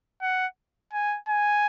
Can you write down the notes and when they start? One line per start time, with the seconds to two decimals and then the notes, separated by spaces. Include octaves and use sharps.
0.22 F#5
0.93 G#5
1.29 G#5